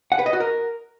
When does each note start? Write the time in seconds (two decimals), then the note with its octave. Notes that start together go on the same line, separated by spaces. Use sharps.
0.12 F#5
0.19 B4
0.26 D#5
0.33 F#4
0.40 A#4